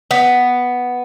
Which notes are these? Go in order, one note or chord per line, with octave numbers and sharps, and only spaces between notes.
B3